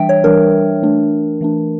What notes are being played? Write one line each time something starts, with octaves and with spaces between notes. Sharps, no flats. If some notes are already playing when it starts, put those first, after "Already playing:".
Already playing: E3 G3 D4 E5 G5
C#5
E3 G3 D4 A#4
E3 A3 D4
E3 A3 D4